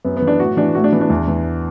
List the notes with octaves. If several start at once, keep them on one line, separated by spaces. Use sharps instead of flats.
F#2 B3
B3
E3
D4
A2 F#4
E3 D4
A2 F#4
D4
E3 B3
D4
E2
E3